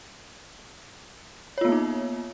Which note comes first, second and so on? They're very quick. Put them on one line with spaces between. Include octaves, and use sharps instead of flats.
C#5 F4 B3 A#3 D#4